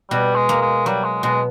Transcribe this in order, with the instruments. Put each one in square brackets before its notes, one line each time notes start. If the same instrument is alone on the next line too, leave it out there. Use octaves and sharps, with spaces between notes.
[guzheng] B2 [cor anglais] G3
[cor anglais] G#3
[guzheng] A#3
[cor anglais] G#3
[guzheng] F#3 [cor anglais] G3
[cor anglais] G#3
[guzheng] B2 [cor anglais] G#3